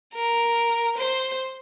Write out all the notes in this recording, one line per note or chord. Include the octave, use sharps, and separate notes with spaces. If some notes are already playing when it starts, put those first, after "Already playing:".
A#4
C5